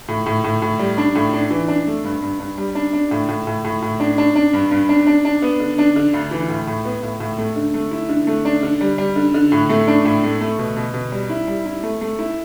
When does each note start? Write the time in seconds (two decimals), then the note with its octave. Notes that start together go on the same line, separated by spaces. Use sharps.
0.08 A2
0.26 A2
0.44 A2
0.62 A2
0.79 G3
0.97 D4
1.15 A2
1.33 D4
1.51 E3
1.68 D4
1.87 A3
2.04 G2
2.22 G2
2.40 G2
2.58 G3
2.75 D4
2.93 D4
3.11 A2
3.29 A2
3.47 A2
3.64 A2
3.82 A2
4.00 D4
4.18 D4
4.36 D4
4.53 G2
4.71 G2
4.89 D4
5.07 D4
5.25 D4
5.42 B3
5.60 D3
5.78 D4
5.96 D3
6.14 D2
6.31 E3
6.49 A2
6.67 A2
6.85 B3
7.03 A2
7.20 A2
7.38 A3
7.56 D3
7.74 A3
7.91 E4
8.09 D3
8.27 A3
8.45 D4
8.63 D3
8.81 G3
8.98 G3
9.16 D3
9.34 D3
9.52 A2
9.69 A3
9.87 D4
10.05 A2
10.23 A3
10.41 A3
10.59 B2
10.76 B2
10.94 B2
11.12 G3
11.30 E4
11.48 G3
11.66 E4
11.83 A3
12.01 A3
12.19 E4